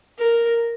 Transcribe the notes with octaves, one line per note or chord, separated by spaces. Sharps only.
A#4